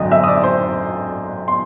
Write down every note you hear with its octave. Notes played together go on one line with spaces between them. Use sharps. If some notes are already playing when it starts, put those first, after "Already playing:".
Already playing: G#1 F#2 D3 D#5 D#6
E5 E6
D#6
D5 D6
C5 C6
C6